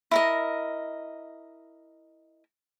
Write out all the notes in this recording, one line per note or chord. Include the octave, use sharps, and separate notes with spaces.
E4 A#4 D#5